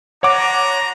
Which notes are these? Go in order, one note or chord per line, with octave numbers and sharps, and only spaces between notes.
D4 F#4 C#5 F#5 A#5 D6